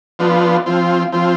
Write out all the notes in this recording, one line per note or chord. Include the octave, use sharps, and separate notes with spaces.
F3 B3 D4 F4
F3 C4 F4
F3 C4 F4